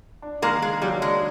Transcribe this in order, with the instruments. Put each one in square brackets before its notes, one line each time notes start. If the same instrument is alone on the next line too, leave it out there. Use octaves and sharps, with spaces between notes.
[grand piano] D4
[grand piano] D#3 [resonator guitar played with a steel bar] G#3 A#3
[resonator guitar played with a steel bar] G#3 [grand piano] A#3
[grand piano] F#3 [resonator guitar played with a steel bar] G3
[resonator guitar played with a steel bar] G#3 [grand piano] D4